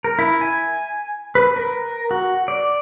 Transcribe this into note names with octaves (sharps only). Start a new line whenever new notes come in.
A#4
E4
G#5
B4
A#4
F#4
D5